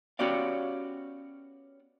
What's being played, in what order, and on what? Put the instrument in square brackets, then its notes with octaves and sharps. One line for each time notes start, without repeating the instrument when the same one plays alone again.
[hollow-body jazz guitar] B3 C#4 F#4 G4 D5 F5